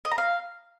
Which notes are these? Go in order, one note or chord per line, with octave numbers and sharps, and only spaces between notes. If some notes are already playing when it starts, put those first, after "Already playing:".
D#5
A#5
F5